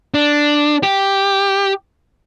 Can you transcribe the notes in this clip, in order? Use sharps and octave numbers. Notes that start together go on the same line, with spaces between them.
D4
G4